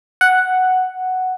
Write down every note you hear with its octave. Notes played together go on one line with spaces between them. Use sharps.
F#5